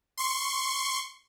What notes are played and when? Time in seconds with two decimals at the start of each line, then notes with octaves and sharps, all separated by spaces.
0.18 C6 C#6